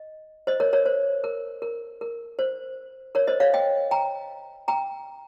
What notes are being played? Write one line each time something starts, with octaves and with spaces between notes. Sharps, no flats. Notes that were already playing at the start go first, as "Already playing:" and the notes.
Already playing: D#5
C5 D#5
A#4 C#5
A#4 C#5
C5
A#4
A#4
A#4
C5
A#4 C#5
C5 D#5
C#5 F5
D#5 G5
G5 A#5
G5 A#5